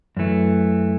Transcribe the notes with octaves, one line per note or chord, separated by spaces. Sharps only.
F#2 E3 A3